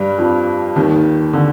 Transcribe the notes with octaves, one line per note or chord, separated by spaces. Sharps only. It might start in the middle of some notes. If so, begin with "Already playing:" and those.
Already playing: G2 G3
F2 F3
D#2 D#3
D3